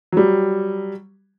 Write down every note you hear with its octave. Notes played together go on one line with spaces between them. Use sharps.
F#3 G3